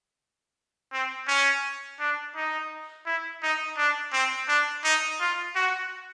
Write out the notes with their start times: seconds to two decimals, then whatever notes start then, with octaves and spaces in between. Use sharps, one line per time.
0.93 C4
1.28 C#4
2.00 D4
2.36 D#4
3.06 E4
3.43 D#4
3.77 D4
4.13 C4
4.48 D4
4.84 D#4
5.20 F4
5.56 F#4